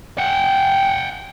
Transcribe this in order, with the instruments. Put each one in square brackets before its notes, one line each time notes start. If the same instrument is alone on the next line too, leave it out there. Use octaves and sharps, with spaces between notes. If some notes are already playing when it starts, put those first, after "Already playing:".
[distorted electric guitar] F#5 G5